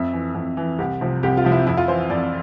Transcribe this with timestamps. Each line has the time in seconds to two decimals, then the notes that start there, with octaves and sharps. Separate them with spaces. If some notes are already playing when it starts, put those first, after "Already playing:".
Already playing: F2 E5
0.13 E3
0.35 F2
0.57 E3
0.78 C2 G4
1.01 C3 F3
1.23 C2 G4
1.37 F4
1.45 C3 F3
1.52 E4
1.67 F2 E4
1.77 F4
1.88 E3 C5
2.10 F2 D5